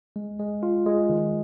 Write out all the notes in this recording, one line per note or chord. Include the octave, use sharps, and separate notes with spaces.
G#3
G#3
F4
G#3
D#3